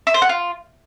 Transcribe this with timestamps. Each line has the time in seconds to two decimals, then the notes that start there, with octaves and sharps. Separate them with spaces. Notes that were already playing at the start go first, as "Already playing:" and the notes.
0.07 E5
0.14 C5
0.22 F#5
0.29 F4